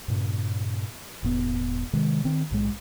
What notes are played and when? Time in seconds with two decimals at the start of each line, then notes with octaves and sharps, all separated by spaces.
0.08 G2 A#2 C#3
1.23 E1 A2 B3
1.93 C3 D#3 G#3
2.25 D#3 C4
2.51 B1 A2 G#3